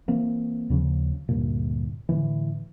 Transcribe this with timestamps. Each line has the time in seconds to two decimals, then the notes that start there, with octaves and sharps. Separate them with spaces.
0.08 E3 A#3 C4
0.70 D#2 C#3 F3
1.29 D2 G2 A#2
2.09 A2 D3 E3